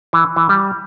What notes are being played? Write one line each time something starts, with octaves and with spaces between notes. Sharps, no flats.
E3
E3
G3